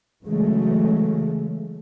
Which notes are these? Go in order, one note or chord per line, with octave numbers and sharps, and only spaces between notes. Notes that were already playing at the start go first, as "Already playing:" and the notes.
C#3 E3 F#3 G#3 A3